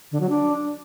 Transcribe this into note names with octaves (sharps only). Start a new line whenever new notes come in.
D3
F#3
D4